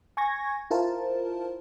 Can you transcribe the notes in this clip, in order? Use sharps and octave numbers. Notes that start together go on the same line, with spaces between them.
G#5 C#6 G#6 A#6
E4 F4 A#4 C5 A5